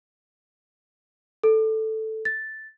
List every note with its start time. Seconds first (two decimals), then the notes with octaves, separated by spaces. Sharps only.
1.43 A4
2.25 A6